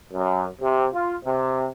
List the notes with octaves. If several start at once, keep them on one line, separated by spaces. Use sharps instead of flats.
F#2
C3
F4
C3